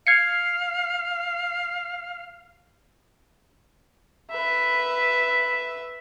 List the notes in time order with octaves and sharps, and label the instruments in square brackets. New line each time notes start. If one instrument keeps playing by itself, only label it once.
[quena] F5 [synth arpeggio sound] G#6 C7 C#7
[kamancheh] B4 E5